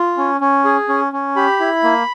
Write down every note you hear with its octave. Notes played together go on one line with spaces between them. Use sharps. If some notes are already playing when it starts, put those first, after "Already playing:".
Already playing: F4
C#4
C#4
G#4
C#4
C#4
G4 B5
E4
A#3